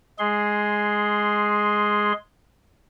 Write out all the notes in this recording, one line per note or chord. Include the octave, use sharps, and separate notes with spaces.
G#3 G#4 C6